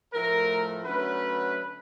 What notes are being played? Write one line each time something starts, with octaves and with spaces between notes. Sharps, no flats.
A2 F3 A3 A#4
D3 F#3 A3 C#4 B4